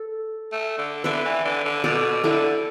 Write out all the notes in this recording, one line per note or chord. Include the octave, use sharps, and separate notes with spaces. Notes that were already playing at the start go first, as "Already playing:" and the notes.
Already playing: A4
A3
D3
D3 B4 E5
E3
D3
D3
B2 A4 D5
D3 E4 A4